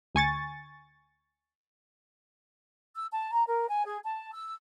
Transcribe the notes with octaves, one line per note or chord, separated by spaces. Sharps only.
D2 G#5 C#6 A6
E6
A5
A#5
A#4
G#5
G#4
A5
E6